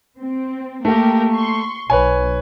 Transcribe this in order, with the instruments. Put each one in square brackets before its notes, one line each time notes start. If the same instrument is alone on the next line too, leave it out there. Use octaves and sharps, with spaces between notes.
[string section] C4
[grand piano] A3 [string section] A#3 G4 A#4
[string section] C6 C#6
[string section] B1 [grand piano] B4 C#5 G#5